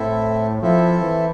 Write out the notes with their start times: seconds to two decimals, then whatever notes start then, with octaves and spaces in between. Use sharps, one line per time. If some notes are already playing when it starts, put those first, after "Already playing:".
Already playing: A2 C4 E4 A4 E5
0.62 F3 C4 E4 A4 E5
1.01 E3